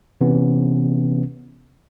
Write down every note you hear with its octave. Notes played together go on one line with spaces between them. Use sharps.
C3 E3 B3 C#4